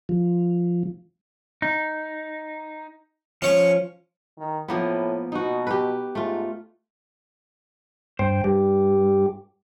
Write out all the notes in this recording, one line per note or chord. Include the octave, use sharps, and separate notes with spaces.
F3
D#4
F3 C#4 C#5
D#3
A2 F3 A#3 B3
B2 D#4 F#4
G4 B4
G#2 A3 F4
G2 C5 G5
G2 G4